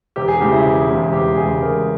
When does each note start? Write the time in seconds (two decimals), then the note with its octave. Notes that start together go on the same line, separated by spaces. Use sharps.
0.16 E1 G4
0.28 G#4
0.40 E2 C#3 G#3 G4
0.53 E4
0.65 E1
0.89 E2 C#3 G#3
1.12 E1 G4
1.37 E2 C#3 G#3 G#4
1.61 E1 A#4